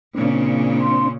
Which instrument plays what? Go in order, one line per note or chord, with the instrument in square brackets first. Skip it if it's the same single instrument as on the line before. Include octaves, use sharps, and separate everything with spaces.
[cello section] A#2 C#3 [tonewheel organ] C4 D4
[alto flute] C6